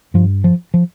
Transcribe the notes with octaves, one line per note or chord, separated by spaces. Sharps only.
G2 F3
F3
F3